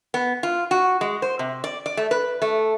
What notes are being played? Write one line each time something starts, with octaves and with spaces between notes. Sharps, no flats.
B3
F4
F#4
G#3
C5
C3
D5
D5
A3
B4
A3